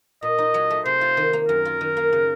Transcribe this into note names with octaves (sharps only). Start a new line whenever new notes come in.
A#2 D#5
D#4
F#3
A3
C3 C5
F4
D#3
A#3
F#2 A#4
F4
D#3
A#3
C#3